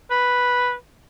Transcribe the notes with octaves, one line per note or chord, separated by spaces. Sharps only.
B4